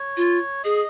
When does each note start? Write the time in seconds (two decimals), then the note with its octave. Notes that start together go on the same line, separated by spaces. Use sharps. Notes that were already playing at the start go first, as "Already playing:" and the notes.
Already playing: C#5
0.17 F4
0.64 G#4 D#5